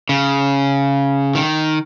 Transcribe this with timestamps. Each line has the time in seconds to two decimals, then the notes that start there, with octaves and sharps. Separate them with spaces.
0.09 C#3
1.35 D#3